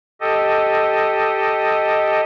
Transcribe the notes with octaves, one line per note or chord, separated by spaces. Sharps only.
G4 A4 D#5